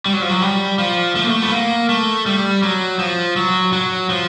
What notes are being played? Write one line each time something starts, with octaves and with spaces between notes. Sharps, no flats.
G3
F#3
F3
F#3
G3
F3
A3
A#3
A3
B3
A#3
A3
G3
F#3
F3
F#3
F#3
F3